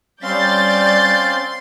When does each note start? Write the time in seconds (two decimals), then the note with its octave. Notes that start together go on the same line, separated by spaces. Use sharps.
0.23 G3 C4 C#4 D5 F5 C6 G6 A6